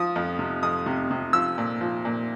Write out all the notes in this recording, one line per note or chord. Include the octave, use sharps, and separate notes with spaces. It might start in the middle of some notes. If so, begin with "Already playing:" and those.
Already playing: F3 D#6
F2
C3
F2 D#6
C3
C3
F3 E6
A#2
F3
A#2